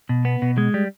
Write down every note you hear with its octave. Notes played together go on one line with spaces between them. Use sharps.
B2
B3
B2
G#3
G3